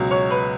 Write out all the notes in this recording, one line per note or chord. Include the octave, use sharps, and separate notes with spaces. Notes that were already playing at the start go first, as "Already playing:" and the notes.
Already playing: C#2 B2 F#3
C#5 C#6
B4 B5